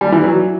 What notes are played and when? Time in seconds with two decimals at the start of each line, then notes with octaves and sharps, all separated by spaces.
0.01 G3
0.12 E3
0.24 F#3